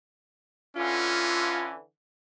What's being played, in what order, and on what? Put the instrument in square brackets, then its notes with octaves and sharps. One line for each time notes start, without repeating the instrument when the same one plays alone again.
[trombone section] D3 E3 [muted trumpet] C#4 [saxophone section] F4